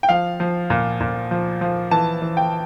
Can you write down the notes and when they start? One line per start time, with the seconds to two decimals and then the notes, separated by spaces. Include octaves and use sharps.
0.03 G5
0.09 F3 F5
0.40 F3
0.70 A#2
1.01 A#2
1.31 F3
1.61 F3
1.91 E3 A5
2.22 E3
2.37 G5